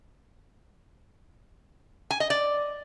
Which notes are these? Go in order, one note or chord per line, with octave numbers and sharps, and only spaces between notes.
G#5
D#5
D5